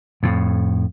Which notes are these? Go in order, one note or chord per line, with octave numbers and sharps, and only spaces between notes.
F2 A2